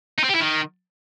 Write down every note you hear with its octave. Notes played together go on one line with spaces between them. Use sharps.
D#4
C4
G4
E4
D#3